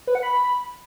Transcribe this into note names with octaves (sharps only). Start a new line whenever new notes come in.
B4
F#5
B5